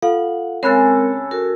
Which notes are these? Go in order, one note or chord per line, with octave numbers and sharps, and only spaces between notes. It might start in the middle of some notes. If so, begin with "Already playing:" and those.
F4 A4 F5 F#5
C#3 G#3 C4 A4 A#4 C#5 B5 F#6
F#4 A4 A#4